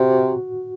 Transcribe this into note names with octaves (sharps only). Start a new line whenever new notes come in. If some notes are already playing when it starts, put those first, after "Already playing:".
Already playing: C3 F#4